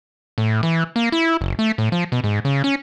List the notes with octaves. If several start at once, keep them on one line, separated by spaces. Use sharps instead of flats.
A2
E3
A#3
E4
F#1
A3
A2
F3
B2
G#2
C#3
C#4